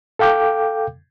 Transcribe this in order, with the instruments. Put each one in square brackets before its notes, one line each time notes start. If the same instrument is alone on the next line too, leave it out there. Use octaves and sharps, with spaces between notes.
[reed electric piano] A4 F5 G5 D6 G6